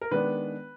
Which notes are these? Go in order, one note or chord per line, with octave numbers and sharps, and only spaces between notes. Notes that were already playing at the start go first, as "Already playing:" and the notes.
A#4
D#3 G#3 B3 D4 B4